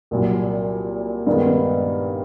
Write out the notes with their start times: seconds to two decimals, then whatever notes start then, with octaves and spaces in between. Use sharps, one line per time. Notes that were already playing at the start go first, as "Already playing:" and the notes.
0.11 C2 A#2 F#3
1.27 G2 D#3 G#3 B3